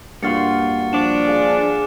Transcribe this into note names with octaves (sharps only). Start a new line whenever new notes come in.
G2 A#3 F4 F#4 C6 F6 A6 C#7
F3 D4 D6 E7
G#4 F5 A#5